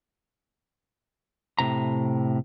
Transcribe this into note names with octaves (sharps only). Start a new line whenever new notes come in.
A2 C3 A#5